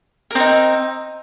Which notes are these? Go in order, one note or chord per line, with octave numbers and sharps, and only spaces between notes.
C4 D#4 A#4